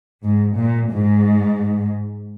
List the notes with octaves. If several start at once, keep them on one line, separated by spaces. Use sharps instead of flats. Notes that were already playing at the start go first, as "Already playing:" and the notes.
G#2
A#2
G#2